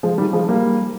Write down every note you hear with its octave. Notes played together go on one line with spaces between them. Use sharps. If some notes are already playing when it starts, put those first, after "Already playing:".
F3 G#3
D#3 G3
F3 G#3
G3 A#3